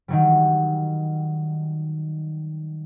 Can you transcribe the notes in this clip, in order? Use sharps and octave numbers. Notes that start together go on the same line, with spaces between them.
D#3 F#3 G3